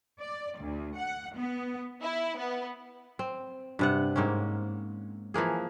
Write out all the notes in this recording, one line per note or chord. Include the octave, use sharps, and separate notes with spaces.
D5
D2
F#5
B3
E4
B3
C4
G2 C3 F#5
G#2 A#3 C4 C#4
E3 F3 A#3 G#4